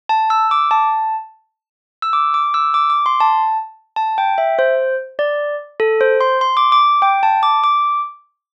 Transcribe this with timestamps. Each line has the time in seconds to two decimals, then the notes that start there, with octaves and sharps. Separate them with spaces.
0.09 A5
0.30 E6
0.51 D6
0.71 A5
2.02 E6
2.13 D6
2.34 D6
2.54 E6
2.74 D6
2.90 D6
3.06 C6
3.20 A5
3.96 A5
4.18 G5
4.38 E5
4.59 C5
5.19 D5
5.80 A4
6.01 C5
6.21 C6
6.41 C6
6.57 D6
6.72 D6
7.02 G5
7.23 A5
7.43 D6
7.64 D6